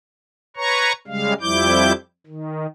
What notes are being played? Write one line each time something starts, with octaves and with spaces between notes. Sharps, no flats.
B4 C#5 A#5 C#6
C#3 G3 G#3 F5
F2 F3 G3 E4 D6 G6
D#3